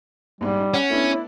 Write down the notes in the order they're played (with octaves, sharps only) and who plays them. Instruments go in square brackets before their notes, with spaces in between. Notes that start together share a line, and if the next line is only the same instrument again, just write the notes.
[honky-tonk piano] A#1 G#2 [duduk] G3
[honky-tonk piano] D#4
[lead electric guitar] C#4 [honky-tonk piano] F#5
[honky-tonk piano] A3 B3 D4 [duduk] E4